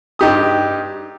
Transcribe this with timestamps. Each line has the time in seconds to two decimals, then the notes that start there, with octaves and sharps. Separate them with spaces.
0.19 G2 D#4 G4 D#6